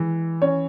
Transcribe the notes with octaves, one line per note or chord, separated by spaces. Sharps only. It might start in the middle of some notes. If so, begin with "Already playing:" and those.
Already playing: E3 G#3
C#4 C#5